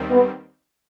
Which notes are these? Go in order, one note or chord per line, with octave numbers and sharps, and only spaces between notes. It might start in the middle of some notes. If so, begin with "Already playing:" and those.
Already playing: D#2 D#3 G3 C4
B3